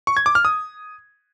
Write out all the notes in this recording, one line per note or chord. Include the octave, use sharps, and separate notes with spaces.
C#6
G#6
D6
F6
D#6